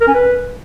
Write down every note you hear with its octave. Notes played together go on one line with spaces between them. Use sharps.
A#4
C#4
B4